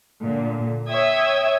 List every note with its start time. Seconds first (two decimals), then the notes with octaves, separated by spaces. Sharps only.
0.21 A#2 D3
0.89 C#5 E5 G5 D#6 E6 G#6